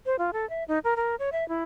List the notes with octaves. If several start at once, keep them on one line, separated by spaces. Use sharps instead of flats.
C5
F4
A4
E5
D#4
A#4
A#4
C#5
E5
E4